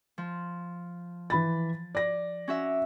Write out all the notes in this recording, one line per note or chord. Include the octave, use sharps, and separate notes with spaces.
F3
E3 B5 A6
D5 A#6
C#4 F#4 E5